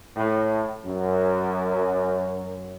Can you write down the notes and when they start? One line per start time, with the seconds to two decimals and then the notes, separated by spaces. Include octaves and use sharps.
0.16 A2
0.85 F#2